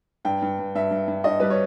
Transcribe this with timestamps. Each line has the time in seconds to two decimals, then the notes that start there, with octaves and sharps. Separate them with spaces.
0.25 G2 G5
0.42 G2
0.59 G2
0.75 G2 E5
0.91 G2
1.08 G2
1.24 G2 D#5
1.40 G3 B4
1.50 C#5